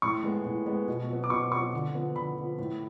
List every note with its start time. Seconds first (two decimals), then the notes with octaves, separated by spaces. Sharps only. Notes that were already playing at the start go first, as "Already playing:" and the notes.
0.02 A2 C#6
0.23 G#3 B3
0.45 A2
0.66 G#3 B3
0.88 B2
1.09 F#3 B3
1.24 D6
1.30 B2 C#6
1.51 F#3 B3 C#6
1.73 D3
1.94 F3 B3
2.15 D3 B5
2.37 F3 B3
2.59 A2